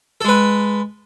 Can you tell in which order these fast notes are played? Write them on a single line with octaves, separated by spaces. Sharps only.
A4 G#3 B4